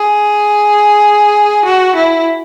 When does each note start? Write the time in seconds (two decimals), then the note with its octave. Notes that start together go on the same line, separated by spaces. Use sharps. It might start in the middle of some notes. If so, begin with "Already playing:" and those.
Already playing: G#4
1.65 F#4
1.96 E4